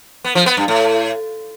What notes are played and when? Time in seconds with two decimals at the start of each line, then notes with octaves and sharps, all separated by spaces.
0.24 B3
0.35 F3
0.46 B3
0.57 G2
0.68 A2